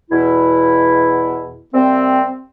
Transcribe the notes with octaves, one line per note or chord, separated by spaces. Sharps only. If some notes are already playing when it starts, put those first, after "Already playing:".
E2 B2 E4
C3 G3 A#3 C4